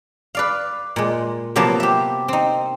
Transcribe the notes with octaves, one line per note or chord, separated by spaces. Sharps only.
B4 D5 F5
A#2 G#3
C3 F3 F#3 A#3 B3 A5
G4 E5
C4 D#4